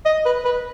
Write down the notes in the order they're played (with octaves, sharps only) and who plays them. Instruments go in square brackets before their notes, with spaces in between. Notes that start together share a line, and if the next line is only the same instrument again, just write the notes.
[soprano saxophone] D#5
B4
B4